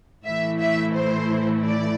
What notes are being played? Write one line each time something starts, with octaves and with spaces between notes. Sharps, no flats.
A2 E3 A3 E4 E5
E5
C5
D5